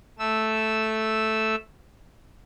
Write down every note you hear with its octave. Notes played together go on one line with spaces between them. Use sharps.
A3 E6